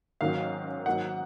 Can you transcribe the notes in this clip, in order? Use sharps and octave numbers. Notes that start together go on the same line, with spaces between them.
G#2 D#3 F#3 A#3 C#4 F5
G#2 F#3 A#3 D#4 F#5